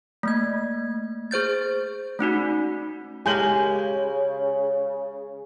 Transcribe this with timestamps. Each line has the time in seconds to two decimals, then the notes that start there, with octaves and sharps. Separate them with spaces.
0.23 A3 A#3 G#6
1.31 G#4 C5 G6 A6
2.19 A3 C#4 D#4 F#4
3.26 C#3 G#3 G4 A#4 G#5 G6 F#7